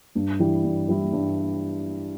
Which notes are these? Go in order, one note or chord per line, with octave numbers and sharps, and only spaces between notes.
G2
E3 G3 E4
G2
E3 G3 E4
G2